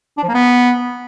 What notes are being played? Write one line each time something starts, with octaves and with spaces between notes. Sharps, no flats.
D4
F3
A#3
B3